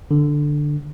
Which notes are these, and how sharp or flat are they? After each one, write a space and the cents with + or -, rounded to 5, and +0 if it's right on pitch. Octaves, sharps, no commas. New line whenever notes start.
D3 +5